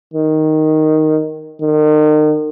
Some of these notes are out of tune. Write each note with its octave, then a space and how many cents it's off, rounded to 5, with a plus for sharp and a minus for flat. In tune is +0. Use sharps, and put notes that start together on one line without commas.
D#3 +0
D#3 -35